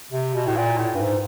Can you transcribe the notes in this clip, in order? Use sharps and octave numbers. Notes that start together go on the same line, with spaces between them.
C3
B2
A2
A#2
A2
G2
G#2